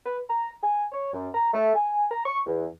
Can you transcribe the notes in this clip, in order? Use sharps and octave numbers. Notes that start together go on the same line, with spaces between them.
B4
A#5
G#5
C#5
F#2
A#5
A3
G#5
A#5
C#6
E2